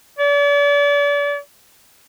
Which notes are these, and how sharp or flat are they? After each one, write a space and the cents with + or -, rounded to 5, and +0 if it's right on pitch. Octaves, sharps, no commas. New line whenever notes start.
D5 -40